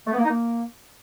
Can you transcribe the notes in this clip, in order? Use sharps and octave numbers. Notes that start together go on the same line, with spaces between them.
A3
B3
A#3
D#4
A#3